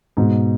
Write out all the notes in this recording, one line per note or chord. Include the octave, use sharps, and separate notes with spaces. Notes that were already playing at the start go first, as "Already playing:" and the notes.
G#2 B2